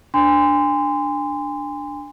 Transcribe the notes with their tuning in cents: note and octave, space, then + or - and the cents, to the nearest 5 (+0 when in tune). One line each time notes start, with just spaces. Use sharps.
D4 +0 G#5 -35 C6 -25